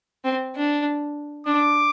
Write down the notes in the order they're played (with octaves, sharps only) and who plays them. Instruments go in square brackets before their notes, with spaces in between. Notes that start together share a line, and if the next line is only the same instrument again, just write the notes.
[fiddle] C4
D4
[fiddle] D4 [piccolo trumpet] D6